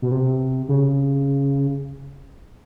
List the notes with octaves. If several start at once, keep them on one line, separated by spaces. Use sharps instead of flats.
B2
C3
C#3